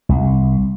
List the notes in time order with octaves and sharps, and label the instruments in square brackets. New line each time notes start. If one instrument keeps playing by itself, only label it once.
[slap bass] C2